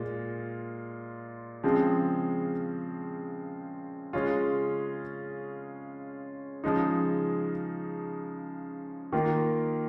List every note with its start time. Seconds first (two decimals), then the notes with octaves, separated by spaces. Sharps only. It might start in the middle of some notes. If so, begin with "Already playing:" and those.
Already playing: A#2 G#3 F4
1.64 C#3 F3 G#3 C4
4.13 C#3 G#3 C#4 F4
6.64 C#3 F3 G#3 D#4
9.12 D#3 A#3 F4